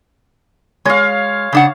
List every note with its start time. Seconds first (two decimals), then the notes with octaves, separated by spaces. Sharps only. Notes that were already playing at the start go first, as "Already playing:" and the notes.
0.85 G#3 C#5 F5
1.53 C#3 D4 F#5